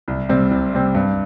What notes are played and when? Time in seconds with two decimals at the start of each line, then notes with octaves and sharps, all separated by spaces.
0.08 C2
0.29 C3 G3 C4
0.51 C2
0.73 C3 G3 C4
0.95 G2